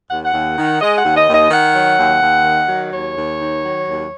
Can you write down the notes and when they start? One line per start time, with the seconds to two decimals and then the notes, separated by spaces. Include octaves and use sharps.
0.09 D#2 F#5
0.25 F#5
0.33 D#2
0.56 D#3
0.80 G#3 D#5
0.97 F#5
1.03 D#2
1.15 D#5
1.27 D#2
1.33 D#5
1.50 D#3 F#5
1.74 F#3
1.97 D#2
2.21 D#2
2.44 D#3
2.68 F#3
2.92 D#2 C#5
3.16 D#2
3.39 D#3
3.62 F#3
3.86 D#2